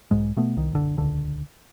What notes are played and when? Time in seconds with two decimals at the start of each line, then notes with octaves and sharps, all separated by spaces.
0.11 B1 G#2 G#3
0.37 B2 A3 B3
0.57 C2 D#3
0.72 F#1 B1 D3
0.97 D#1 C#2 D3